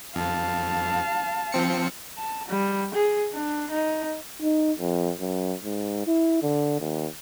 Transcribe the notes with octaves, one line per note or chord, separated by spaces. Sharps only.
F2 F5 A5
F3 C4 C#7
A5
G3
G#4
D4
D#4
D#4
F2
F#2
G#2
E4
D3
D#2